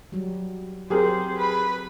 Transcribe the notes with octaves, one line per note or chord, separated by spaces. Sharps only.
F#3 G3
F#3 C4 G4 G#4 A#4 C5
B4 B5